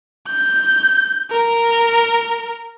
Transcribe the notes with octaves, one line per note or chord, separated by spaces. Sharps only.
G6
A#4